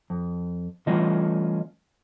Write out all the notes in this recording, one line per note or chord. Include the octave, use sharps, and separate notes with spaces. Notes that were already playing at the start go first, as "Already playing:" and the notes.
F2
E3 G3 A3 C#4 F4 D#5